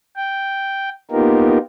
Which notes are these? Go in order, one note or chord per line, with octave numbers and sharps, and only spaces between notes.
G5
A#3 B3 D#4 F4 G4 A#4